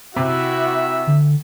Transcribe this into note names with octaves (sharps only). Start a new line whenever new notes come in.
C3 E4 F#4 E5
D3